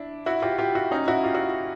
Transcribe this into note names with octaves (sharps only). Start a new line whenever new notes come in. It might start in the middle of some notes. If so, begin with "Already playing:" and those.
Already playing: D4 E4
E4 F#4
F4 G4
F4 G4
E4 F#4
C#4 D#4
E4 F#4
F4 G4
E4 F#4